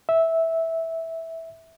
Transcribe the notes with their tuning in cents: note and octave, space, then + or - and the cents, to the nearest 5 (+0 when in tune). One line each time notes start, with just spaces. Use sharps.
E5 -10